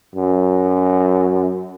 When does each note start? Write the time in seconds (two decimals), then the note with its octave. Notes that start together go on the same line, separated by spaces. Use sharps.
0.15 F#2